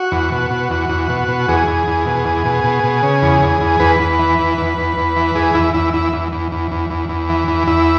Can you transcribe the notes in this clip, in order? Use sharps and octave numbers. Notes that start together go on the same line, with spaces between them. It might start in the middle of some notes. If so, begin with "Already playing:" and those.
Already playing: F#4
E2
B2
B2
E2
E2
B2
B2
E2 G#4
E2
E2
B2
E2
B2
B2
B2
C#3
E2
E2
E2
E2 B4
E2
E3
E2
E2
E2
E2
E3
E2 G#4
E2 E4
E2 E4
E2 E4
E2
E2
E2
E2
E2
E2
E3
E2
E2 E4